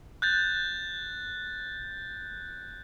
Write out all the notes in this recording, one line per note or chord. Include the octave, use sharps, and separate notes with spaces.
F#6 G6 A6